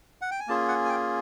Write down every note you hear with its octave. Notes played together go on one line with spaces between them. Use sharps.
F#5
G5
G#5
A#3 C#4 F4 G#4 A5
F#5
G#5
G5